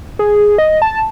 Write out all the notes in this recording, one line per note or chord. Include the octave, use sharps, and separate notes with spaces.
G#4
D#5
A5